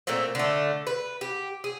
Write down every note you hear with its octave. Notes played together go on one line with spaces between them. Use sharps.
A#2 A3 A#3 C4
D3 A3
B4
G4
G#4